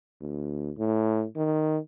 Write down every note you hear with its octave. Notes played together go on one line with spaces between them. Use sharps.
D2
A2
D#3